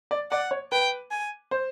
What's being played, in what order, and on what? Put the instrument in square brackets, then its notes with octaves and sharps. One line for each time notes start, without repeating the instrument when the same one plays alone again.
[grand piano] D5
[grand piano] D5 [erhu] F#5
[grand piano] C#5
[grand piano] B4 [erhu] G5
[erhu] G#5
[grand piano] C5